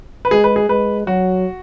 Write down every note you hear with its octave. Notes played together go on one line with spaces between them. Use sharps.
B4
G#3 G#4
B4
G#4
G#3 B4
F#3 F#4